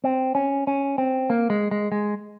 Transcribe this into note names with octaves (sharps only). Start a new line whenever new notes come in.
C4
C#4
C#4
C4
A#3
G#3
G#3
G#3